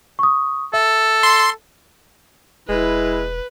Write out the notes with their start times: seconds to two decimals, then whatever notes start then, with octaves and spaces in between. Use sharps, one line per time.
0.19 C#6 D#6
0.74 A4 E5
1.23 C6
2.69 E1 G#3 E4 B4